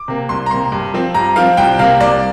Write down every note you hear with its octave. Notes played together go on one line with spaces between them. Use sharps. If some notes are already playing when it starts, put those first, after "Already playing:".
Already playing: D6
C3 A#3
C2 C6
A#5
C3 A#3 C6
G2
F3 C4
G2 A#5
F3 C4 F5
C2 G5
C3 A#3 F5
C2 D5